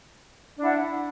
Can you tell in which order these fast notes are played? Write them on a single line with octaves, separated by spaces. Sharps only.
D4 E4 F#5